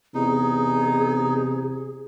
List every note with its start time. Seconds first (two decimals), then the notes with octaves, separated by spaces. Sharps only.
0.15 E2 C3 D#4 G#4